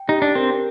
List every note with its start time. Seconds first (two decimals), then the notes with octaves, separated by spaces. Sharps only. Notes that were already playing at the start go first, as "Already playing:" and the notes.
Already playing: G5
0.08 D#4 G4
0.22 D4
0.35 C4 A#4